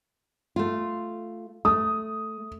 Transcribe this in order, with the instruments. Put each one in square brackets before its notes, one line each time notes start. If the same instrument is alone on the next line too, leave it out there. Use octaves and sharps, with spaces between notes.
[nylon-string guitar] A3 F4
[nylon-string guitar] A3 [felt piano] D#6